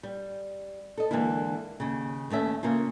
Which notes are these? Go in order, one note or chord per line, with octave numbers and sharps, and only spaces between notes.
G3
A4 D#5
D3 E3 G#3 A#3 E4
D#2 C#3
D#2 A3 C#4 E5
C#3 A#3 C#4 F4